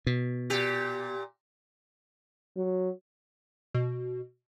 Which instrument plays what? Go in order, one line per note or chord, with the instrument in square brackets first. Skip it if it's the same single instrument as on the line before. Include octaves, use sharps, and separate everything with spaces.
[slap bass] B2
[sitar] A#2 G4
[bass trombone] F#3
[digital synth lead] B2